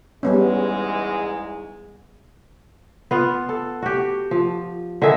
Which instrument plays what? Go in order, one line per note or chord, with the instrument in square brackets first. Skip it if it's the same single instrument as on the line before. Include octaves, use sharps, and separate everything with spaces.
[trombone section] E2 G#2 G#3 [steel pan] G3 B3 C#4
[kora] B3 F4
A4
F#4 G4
F3
D3 D#3 G#4 E5